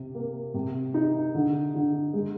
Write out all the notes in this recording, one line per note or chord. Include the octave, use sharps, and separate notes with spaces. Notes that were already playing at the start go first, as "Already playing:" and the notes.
Already playing: C3
A#3
C3
D#4
D3
D3
G#3